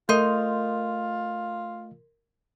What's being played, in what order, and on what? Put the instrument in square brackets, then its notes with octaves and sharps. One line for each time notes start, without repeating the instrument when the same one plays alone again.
[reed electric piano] A3 D#5 [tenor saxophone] F4 [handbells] A#4 C6 G6